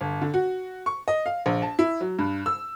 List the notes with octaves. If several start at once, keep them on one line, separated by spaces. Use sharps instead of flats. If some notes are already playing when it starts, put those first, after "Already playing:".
G1
D3
F#4
C#6
D#5
F5
A#1
A5
E4
F#3
G2
E6